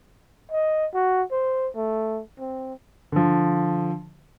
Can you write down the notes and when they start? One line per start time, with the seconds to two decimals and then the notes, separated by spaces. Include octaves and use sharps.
0.52 D#5
0.94 F#4
1.31 C5
1.76 A3
2.40 C4
3.12 D3 F3